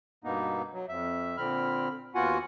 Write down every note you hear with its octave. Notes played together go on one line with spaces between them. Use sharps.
G2 B2 A#3 B3 D#4
F#3
F2 E5
A#2 D3 C4 B5 F6
D#2 B3 F4 F#4 F#5 G#5